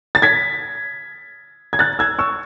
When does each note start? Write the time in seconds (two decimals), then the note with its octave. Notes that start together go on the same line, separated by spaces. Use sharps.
0.15 A6
0.22 G#6 B6
1.73 G#6
1.79 F#6 A6
1.99 E6 G#6
2.19 C#6 E6